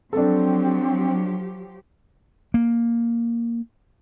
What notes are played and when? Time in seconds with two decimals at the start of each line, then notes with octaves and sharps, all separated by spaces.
0.13 F3 F#3 C4 D4 G4 A4
2.54 A#3